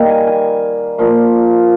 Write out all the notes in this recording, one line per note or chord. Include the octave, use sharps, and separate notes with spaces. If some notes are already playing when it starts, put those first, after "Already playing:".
Already playing: D#3 G3 A#3 A#5
G#5
G#5
A#2 F3 A#3